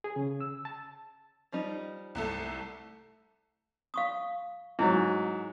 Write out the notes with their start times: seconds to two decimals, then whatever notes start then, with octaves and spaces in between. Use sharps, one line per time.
0.04 G#4
0.16 C#3
0.41 E6
0.65 A5
1.52 F3 G3 D#4
2.15 C2 A3 A4
3.94 F5 C#6 D#6
4.79 G#2 F#3 E4